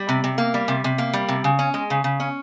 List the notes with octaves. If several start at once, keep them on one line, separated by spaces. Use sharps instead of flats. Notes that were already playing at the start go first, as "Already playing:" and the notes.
Already playing: G3
C3
C3
A#3
G3
C3
C3
A#3
G3
C3
C#3
C#4
G#3
C#3
C#3
C#4